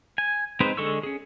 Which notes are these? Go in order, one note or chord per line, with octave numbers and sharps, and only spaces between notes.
G#5
G#3 C4 D#4 B4 C5
D3 G#3 A4 C#6 E6
C#4 G#4